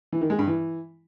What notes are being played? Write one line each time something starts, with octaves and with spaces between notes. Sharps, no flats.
E3
D#3
G#3
G2
E3